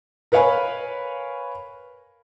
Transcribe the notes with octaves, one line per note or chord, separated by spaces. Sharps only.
A#4 B4 C#5 F5 G#5 B5